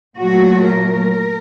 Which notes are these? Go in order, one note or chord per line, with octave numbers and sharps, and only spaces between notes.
A#2 F#3 A3 F#4
A#4